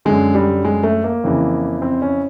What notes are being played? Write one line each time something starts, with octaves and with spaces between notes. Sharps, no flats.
F#2 D3 G#3
G3
G#3
A3
A#3
F2 C#3 E3
C4
C#4